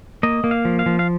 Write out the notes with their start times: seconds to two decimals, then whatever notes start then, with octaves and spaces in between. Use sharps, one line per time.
0.23 A#3 D#5
0.44 A#3
0.51 F5
0.65 F3
0.79 F5
0.86 F3
0.99 F5